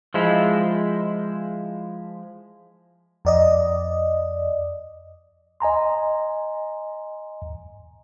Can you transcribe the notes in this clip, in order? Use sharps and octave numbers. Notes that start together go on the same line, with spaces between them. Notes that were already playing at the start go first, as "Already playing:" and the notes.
F3 G#3 E4
F2 D5 D#5
D#5 G#5 A#5 C6